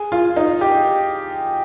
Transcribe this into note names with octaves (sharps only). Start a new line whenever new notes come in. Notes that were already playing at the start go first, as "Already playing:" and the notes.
Already playing: G#4
F4
D#4
G4